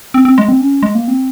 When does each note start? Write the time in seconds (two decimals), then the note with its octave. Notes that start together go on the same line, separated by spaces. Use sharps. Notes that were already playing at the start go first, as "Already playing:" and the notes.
0.14 C4
0.25 C4
0.38 G#3
0.49 C4
0.61 C#4
0.83 G#3
0.95 A#3
1.08 C4